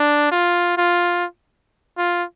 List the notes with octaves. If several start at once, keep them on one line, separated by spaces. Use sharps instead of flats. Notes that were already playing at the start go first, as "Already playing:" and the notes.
Already playing: D4
F4
F4
F4